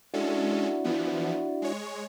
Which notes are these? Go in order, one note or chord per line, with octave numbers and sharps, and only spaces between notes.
G#3 C#4 D4 E4 F#4 A4
E3 F3 B3
G#3 C#5